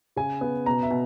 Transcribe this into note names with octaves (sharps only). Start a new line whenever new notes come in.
C#3 G#5
B3
B2 A#5
E5
B2